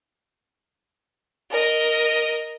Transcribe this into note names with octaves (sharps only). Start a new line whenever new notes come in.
A#4 D#5